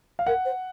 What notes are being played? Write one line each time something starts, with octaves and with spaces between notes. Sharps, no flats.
F5
A#4 F#5
C5